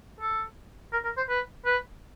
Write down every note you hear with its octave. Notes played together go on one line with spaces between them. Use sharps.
A4
A#4
A#4
C5
B4
B4